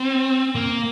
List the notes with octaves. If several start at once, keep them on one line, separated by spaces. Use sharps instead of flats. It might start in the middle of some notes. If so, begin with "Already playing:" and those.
Already playing: C4
A#3